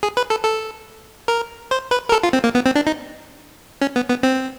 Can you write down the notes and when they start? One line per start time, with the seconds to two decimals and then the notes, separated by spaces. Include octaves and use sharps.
0.03 G#4
0.17 B4
0.30 A4
0.45 A4
1.28 A#4
1.71 C5
1.91 B4
2.09 A#4
2.12 A4
2.23 F4
2.33 C4
2.44 A#3
2.55 B3
2.66 C4
2.75 D4
2.87 D#4
3.81 C#4
3.96 B3
4.09 B3
4.23 C4